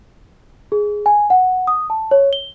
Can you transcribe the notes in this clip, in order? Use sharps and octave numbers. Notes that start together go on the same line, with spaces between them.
G#4
G#5
F#5
D#6
A5
C#5
G7